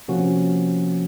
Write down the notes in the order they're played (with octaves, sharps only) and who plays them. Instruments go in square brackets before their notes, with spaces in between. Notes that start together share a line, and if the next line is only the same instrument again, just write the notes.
[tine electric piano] C3 F3 A#3 C#4 F#4